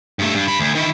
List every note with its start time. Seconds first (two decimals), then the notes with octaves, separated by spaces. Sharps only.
0.19 G2 A3
0.34 G2
0.48 G2 B5
0.59 D2
0.75 D#3 E4